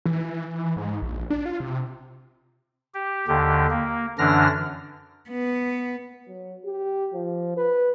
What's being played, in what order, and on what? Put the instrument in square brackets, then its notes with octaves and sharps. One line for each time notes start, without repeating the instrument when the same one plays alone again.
[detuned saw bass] E3
G#2
A#1
D4
F4
C3
[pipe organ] G4
D#2 D3 G4
A#3
F#2 D3 E3 D4 F6 A#6
[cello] B3
[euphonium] F#3
G4
F3
B4